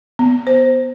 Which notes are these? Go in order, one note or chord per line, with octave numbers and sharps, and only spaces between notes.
B3
C5